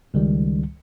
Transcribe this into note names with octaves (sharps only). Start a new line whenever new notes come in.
C#2 D#3 G3